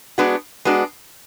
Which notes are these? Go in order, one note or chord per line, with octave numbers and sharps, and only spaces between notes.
G#3 B3 D4 F#4
G#3 B3 D4 F#4